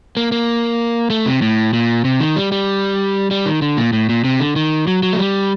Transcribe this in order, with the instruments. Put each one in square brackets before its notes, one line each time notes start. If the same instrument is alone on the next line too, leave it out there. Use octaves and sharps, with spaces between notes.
[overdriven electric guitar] A#3
A#3
A3
C3
A2
A#2
C3
D#3
G3
G3
G3
D#3
D3
A#2
A2
A#2
C3
D3
D#3
F#3
F#3
A3
G3